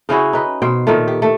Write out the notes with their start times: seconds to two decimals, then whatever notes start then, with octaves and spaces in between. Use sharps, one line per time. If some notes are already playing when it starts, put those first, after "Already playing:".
0.09 C#3 C#4 E4 F#4
0.33 D#4 B4
0.62 B2 C5 G5
0.87 A#2 D#3 A3
1.08 G4
1.22 A3